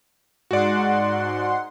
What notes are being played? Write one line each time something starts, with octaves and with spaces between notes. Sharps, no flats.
G#2 F#4 D5 F#5 C6